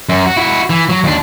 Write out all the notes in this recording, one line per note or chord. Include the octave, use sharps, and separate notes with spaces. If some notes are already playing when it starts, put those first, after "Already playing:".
F#2
F#4
E4 F#4
E3
F#3
D#2 D4